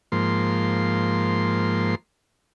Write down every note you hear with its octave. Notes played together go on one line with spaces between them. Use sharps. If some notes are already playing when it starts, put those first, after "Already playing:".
G#2 F3 A#3 C6